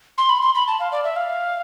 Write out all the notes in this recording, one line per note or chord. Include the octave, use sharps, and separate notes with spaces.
C6
B5
C6
B5
A5
F5
D5
E5
F5